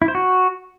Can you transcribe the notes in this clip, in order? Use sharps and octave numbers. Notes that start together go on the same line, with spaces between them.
E4
C5
F#4